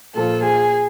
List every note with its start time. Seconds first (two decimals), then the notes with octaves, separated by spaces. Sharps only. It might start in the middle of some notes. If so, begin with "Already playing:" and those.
0.15 A#2 F3 A4
0.44 G#4